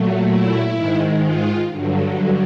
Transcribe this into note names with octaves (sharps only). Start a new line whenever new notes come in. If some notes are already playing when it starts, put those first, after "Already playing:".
Already playing: A#2 F#3 A3
E4
G#2 D#3 G#3
F4
G2 D3 F#3